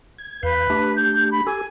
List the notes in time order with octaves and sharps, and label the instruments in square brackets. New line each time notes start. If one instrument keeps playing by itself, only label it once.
[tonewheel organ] G#6
[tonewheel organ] E2 F5 G6 [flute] B4
[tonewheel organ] A3 D4 G4
[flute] G6
B5
[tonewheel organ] G4 A4 [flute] G#5